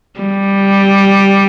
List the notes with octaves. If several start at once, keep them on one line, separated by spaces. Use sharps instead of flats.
G3